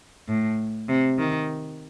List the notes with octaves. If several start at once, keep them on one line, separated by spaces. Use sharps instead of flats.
A2
C3
D#3